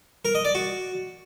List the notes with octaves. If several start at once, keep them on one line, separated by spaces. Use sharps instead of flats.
A#4
D#5
D5
F#4